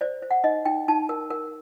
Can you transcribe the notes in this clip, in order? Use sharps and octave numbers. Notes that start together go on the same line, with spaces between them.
C5 D5
C5
F#5
D#4 D#5
D#4 G5
D#4 A5
A#4
A#4